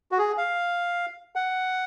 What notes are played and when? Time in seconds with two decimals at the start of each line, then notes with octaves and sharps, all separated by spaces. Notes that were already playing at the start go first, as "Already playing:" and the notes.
0.12 F#4
0.18 G#4
0.38 F5
1.35 F#5